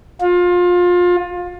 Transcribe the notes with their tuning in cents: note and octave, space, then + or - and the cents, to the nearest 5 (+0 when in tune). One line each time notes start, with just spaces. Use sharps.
F4 +25